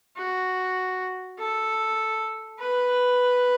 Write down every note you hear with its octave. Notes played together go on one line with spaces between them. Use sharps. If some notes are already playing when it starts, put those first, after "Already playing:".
F#4
A4
B4